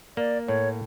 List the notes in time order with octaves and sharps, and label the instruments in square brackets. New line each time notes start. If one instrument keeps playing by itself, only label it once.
[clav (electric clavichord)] A#3 [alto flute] D5
[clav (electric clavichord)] A2 [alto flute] C#5